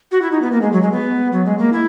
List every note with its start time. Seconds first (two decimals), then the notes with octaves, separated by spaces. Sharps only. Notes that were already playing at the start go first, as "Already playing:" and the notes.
0.12 F#4
0.22 E4
0.32 D#4
0.42 B3
0.52 A#3
0.62 G#3
0.72 F#3
0.82 G#3
0.92 B3
1.32 F#3
1.45 G#3
1.58 A#3
1.73 E4